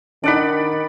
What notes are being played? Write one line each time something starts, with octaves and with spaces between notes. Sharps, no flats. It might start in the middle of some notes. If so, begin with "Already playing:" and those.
D#3 D4 D#4 D5 F#5 B5